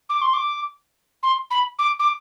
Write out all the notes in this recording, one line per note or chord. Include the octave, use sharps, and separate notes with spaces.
D6
C6
D6
C6
B5
D6
D6